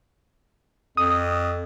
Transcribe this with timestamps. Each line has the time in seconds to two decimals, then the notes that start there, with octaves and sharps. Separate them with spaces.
0.97 F2 D#6